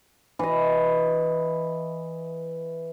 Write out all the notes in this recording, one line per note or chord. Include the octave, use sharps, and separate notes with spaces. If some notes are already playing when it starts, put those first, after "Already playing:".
E3 D#5